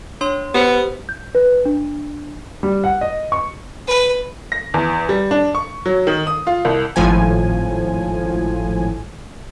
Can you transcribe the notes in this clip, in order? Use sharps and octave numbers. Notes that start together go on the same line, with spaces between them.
D4 C#5 C6
B3 G4 C5
G6
B4
D4
G3
F#5
D#5
C#6
B4
A#6
E2
G3
D4
C#6
F#3
D#3
D#6
F4
C2
G#1 A2 F3 G#5